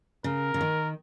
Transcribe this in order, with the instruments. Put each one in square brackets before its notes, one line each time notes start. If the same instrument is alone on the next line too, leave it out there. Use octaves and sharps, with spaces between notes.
[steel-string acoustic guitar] C#3 [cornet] A#4
[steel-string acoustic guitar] C#3
D#3